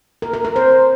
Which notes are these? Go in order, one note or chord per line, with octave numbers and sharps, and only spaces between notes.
A#4
A#4
A#4
C5